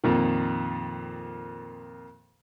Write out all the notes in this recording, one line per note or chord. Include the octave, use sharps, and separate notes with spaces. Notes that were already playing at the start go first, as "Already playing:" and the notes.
F2 A#2 D#3